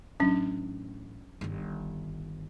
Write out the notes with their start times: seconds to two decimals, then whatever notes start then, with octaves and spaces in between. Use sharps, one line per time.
0.20 A1 F#3 C#4 D4
1.41 G1 D#3